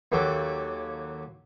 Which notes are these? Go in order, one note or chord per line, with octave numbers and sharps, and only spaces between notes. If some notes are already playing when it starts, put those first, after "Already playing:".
D#2 F#3 A#3 A4 G5 D6